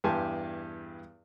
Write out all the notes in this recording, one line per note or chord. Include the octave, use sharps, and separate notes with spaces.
E2 G2 G4 G#5 A5 C6